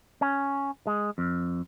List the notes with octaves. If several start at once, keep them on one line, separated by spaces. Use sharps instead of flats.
C#4
G#3
F2